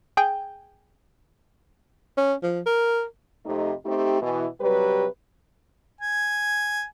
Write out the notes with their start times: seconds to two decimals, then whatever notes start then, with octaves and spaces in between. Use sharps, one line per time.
0.17 G#4 G5
2.17 C#4
2.43 F3
2.66 A#4
3.46 F2 C3 A3 D#4 G4 D#5
3.86 A3 C4 D#4 G4
4.22 B2 E3
4.61 C3 F#3 G3 G4 B4
6.01 G#5